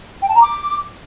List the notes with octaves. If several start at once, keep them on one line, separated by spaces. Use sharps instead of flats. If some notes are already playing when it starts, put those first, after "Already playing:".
G5
A5
A#5
D6